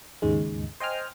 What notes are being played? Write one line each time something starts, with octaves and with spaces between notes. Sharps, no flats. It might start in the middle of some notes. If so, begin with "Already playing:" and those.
D#2 G#2 C#3 G#3
C5 D#5 G5 G#5 F6